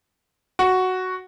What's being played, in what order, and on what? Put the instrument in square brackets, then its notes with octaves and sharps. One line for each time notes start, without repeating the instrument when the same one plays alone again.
[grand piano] F#4